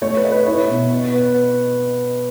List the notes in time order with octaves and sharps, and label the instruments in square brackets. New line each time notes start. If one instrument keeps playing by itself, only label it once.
[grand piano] A3 [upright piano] C#5
[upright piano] B4
[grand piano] D#5
[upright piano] B4
[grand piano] E4 [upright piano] C#5
[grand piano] B2
B3
B3